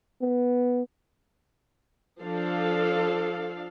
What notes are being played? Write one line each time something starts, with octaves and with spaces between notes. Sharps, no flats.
B3
F3 D4 A4 F5